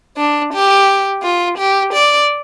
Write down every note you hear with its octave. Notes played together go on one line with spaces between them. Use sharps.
D4
G4
F4
G4
D5